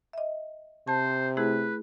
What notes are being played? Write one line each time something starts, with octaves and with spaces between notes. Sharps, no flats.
D#5 E5
C3 C5 A5
A3 E4 G#4 B4